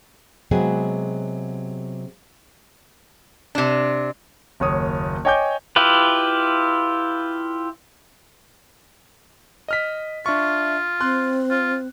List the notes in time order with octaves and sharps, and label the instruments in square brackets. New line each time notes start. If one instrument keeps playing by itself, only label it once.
[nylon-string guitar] C3 F#3 G#3 B3 C4 G#4
[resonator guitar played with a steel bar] C3 D4
[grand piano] F#1 D#2 C#5 D#6
C#5 D#5 G5 G#5 D6 G6
[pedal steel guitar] E4 F4 G4 B4
[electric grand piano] D#5 F6 B6
[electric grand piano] D4 C#6 [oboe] F4 [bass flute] E5
[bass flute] C4 [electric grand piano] C6 F#6
[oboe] F4